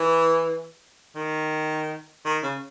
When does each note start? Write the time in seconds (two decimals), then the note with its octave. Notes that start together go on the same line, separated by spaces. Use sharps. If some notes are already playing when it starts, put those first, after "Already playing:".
Already playing: E3
1.15 D#3
2.25 D#3
2.43 C#3